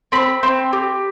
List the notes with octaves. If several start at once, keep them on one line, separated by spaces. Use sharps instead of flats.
C4 B5
C4
G4